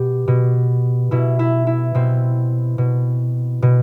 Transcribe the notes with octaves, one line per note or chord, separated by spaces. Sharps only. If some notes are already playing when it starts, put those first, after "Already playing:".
Already playing: B2 G4
B2
B2 E4
E4
E4
B2 C4
B2
B2